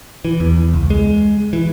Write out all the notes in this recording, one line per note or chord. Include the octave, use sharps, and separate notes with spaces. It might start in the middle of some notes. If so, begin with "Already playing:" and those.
E3
E2
C#2
G#3
E3